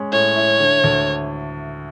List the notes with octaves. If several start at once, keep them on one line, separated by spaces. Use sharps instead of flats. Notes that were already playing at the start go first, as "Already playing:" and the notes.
Already playing: G#3 C#4
A2 C#5
E4
D3
D2